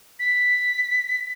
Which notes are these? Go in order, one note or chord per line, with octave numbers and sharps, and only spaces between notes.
B6